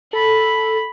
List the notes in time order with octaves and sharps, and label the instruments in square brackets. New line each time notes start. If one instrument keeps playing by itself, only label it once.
[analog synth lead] A4 [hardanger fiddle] B5